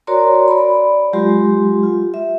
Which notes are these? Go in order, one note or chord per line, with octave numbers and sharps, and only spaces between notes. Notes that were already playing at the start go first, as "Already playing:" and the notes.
F#4 A#4 C#5 D5 A#5 C6
D5 B5
F#3 G#3 F4 G4 C6
F4
E5